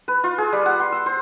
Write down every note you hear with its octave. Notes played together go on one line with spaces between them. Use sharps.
B4
F4
G#4
G3
F#5
C6
E6
C5